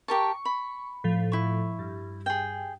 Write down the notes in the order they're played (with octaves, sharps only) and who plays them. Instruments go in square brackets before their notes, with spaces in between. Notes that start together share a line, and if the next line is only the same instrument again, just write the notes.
[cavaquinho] G4 A#4 A5 [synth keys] C#6
[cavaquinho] B5
[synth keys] A2 F3
[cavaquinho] E4 C#6
[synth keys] G2
[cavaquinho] G#4 G5